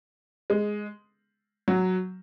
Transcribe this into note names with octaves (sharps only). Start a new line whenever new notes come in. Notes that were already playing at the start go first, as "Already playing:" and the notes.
G#3
F#3